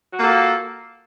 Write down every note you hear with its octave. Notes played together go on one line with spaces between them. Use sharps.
A#3 F4 F#4 A4